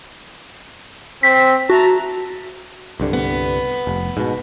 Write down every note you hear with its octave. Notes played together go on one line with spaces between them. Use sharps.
C4 B6
F#4 E5 A5 A#5
C2 G2 D3
B3
F1
G#2 B2